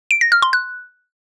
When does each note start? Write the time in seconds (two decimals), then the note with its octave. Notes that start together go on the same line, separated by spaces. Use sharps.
0.11 D7
0.21 A#6
0.32 F6
0.42 C6
0.53 F#6